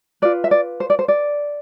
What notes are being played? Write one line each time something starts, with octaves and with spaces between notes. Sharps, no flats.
F4 B4 D5
E5
D5
C5
D5
C5
D5